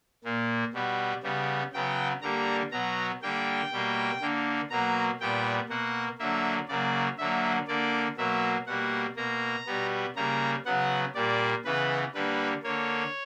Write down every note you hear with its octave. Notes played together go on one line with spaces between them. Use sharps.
A#2 A#3
B2 G3 B3
C#3 G3 B3
C#3 F#3 B3 G5
D3 G3 A#3 A#5
B2 F#3 B3 A#5
D3 G3 A#3 G5
B2 G3 A#3
D3 A#3
B2 F#3 A#3 A#5
A#2 G3 B3 G5
B2 A#3 F#5
D3 F#3 A#3 E5
C#3 F#3 A#3 D5
D3 F#3 A#3 E5
D3 A#3 D5
B2 F#3 A#3 E5
B2 G3 A#3 F#5
B2 A#3 A#5
B2 G3 B3
C#3 G3 A#3 A#5
C#3 F#3 B3 F#5
A#2 G3 A#3 D5
C#3 E3 B3 B4
D3 G3 A#3 B4
D3 A#3 C#5